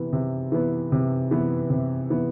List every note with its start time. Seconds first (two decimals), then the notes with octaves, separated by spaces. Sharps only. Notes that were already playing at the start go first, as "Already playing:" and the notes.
Already playing: C3 E3 B3
0.13 C3
0.52 E3 B3
0.92 C3
1.31 E3 B3
1.70 C3
2.10 E3 B3